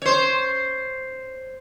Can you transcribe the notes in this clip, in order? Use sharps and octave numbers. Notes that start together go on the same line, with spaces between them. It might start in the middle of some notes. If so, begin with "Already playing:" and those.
C5 C#5